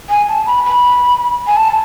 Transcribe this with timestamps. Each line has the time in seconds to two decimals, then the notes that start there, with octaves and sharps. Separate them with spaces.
0.09 G#5
0.28 A5
0.46 B5
0.64 B5
1.47 G#5
1.57 A5